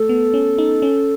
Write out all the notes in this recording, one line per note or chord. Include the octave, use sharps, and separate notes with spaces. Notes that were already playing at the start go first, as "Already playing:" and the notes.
Already playing: A3 A4
B3
C#4
D#4
C#4